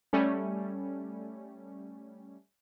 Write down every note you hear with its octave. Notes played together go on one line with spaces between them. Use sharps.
G3 A3 C#4